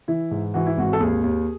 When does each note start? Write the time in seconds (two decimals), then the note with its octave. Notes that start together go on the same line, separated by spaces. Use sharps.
0.08 E3 E4
0.31 G#2
0.54 E3 F#4
0.66 E4
0.78 G#1 F#4
0.93 A4
1.00 D#2 G#4
1.24 D#2